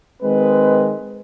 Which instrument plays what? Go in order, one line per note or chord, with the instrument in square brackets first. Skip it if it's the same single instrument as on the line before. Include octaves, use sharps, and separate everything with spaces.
[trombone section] D#3 G#3 C4 B4